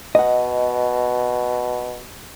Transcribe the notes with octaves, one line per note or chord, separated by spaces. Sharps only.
B2 D#5 F#5